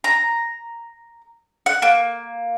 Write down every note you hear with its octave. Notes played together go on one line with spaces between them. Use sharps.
A#5
F#5
A#3